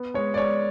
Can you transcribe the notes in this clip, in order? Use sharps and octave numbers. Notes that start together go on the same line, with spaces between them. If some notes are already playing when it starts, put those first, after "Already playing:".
Already playing: B3
G#3 C#5
D5
G#3 C#5